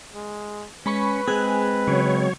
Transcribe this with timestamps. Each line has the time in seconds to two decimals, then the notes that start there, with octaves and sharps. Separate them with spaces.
0.14 G#3
0.86 G#3 C#4 B4 B5 C#6
1.27 G#3 C4 G#4 G#5 F#6
1.87 C#3 F#3 C#5